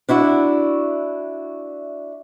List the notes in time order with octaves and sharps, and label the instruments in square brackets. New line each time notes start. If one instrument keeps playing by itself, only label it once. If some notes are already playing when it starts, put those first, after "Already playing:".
[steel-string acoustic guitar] D4 E4 F#4 E5